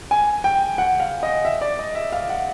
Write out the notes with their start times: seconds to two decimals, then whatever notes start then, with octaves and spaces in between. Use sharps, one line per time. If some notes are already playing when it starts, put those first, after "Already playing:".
0.11 G#5
0.44 G5
0.78 F#5
1.00 F5
1.23 D#5
1.45 E5
1.61 D5
1.79 D#5
1.95 E5
2.12 F5
2.30 F#5